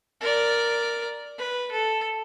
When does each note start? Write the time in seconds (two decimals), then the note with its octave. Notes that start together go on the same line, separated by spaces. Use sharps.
0.21 A#4 D5
1.39 B4
1.72 A4